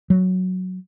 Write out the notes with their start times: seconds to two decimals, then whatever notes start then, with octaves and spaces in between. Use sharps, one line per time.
0.10 F#3